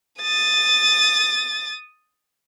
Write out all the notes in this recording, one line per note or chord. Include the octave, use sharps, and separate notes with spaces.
D#6 A6